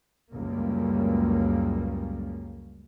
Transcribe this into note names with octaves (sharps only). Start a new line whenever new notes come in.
C#2 F#2 C#3 G3 A#3